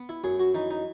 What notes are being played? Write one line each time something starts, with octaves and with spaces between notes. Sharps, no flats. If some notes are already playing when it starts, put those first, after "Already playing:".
Already playing: B3
E4
F#2 G#4
F#4
E3 D#4
D#4